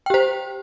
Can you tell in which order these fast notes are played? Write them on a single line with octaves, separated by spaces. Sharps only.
G5 G4 C5